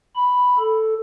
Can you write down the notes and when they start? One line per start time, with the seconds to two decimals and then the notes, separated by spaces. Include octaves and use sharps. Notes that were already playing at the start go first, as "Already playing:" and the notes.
0.15 B5
0.59 A4